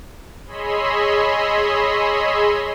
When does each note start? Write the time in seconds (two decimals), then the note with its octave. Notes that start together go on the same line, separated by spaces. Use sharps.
0.47 G#4 C#5 D#5 B5 C6 E6